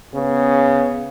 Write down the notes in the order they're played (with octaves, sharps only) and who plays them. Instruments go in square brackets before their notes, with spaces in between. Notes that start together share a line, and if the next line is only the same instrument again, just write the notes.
[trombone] C#3 [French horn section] B3